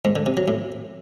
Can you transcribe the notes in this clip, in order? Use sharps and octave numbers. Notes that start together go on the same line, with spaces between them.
G#2
D3
C3
F#3
A2